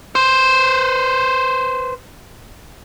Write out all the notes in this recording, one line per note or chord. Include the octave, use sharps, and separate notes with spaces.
B4 C5